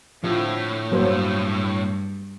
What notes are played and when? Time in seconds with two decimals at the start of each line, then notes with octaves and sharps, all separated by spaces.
0.24 A2 D3 F3 E4
0.92 G2 F#3 A#3 C5